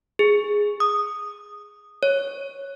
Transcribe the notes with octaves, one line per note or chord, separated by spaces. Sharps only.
G#4
D#6
C#5